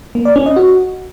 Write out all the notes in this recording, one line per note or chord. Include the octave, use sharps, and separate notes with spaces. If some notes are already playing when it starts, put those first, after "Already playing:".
A#3
D5
C#4
D#5
F#4